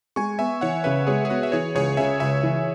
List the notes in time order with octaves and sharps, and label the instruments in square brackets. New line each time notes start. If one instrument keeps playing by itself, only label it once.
[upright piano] G#3 [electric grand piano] G#5 C#6
[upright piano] B3 [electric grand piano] E5 G#5
[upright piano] E3 [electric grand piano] C#5 F#5
[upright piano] C#3 [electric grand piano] B4 E5
[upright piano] G#3 [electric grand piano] G#4 C#5
[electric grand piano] G#4
[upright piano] B3 [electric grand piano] F#4 B4
[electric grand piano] E5
[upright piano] E3 [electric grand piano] G#4 C#5
[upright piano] C#2 [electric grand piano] G#4 C#5
[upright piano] C#3 [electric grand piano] E5 G#5
[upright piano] C#2 [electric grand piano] E5 G#5
[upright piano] E3